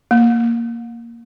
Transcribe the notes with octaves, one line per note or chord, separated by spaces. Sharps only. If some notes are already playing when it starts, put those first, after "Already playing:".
A#3